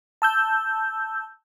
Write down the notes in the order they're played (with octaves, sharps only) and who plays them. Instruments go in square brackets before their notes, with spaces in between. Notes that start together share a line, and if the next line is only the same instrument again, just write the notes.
[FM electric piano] A5 E6 G6